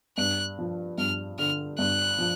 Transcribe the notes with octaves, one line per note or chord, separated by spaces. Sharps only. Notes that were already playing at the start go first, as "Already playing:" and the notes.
G2 F#6
F3
G2 F6
D3 F6
G2 F#6
F3